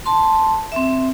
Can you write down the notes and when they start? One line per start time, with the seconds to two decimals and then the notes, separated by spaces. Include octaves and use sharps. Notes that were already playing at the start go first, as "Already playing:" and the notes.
0.06 A5 C6
0.72 C4 E5